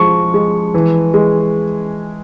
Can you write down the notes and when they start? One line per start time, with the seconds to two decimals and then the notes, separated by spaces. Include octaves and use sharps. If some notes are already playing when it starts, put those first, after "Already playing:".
Already playing: F3 G#3 C#6
0.34 G#3
0.74 E3
1.14 G#3